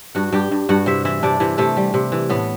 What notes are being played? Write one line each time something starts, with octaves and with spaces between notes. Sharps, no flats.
G2 F#4 F#5
G2 G4 G5
G2
G2 F#4 F#5
C3 E4 E5
E3 E4 E5
C3 D4 D5
C3 E3 E4
C3 A3
G3
C3
E3
A2 B3